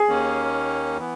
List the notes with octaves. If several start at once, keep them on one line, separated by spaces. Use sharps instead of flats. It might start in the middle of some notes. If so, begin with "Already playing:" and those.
Already playing: G#4
D#2 D#3 A#3 C#4
E3 B3